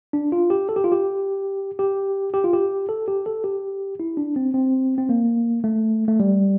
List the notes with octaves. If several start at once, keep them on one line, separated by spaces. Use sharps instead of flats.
D4
F4
G4
A4
G4
F4
G4
G4
G4
F4
G4
A4
G4
A4
G4
E4
D4
C4
C4
C4
A#3
A3
A3
G3